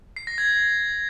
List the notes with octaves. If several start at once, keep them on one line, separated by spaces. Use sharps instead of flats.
C7
A#6
G#6